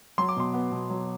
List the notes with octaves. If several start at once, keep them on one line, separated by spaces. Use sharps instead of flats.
F#3 C6
D6
B2 C6
B3
B2
F#3